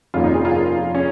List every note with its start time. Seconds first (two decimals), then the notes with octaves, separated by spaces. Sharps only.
0.14 F1 F2 D#3 A#3 C#4 F4
0.24 D#4
0.34 G#4
0.45 F4
0.95 C#4